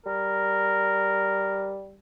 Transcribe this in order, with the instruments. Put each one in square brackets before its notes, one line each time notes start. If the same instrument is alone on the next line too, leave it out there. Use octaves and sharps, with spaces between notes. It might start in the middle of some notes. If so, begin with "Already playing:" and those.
[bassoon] G3 [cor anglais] A#4